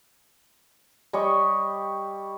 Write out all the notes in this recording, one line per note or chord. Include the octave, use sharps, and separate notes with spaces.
G3 C#5 D#5 C#6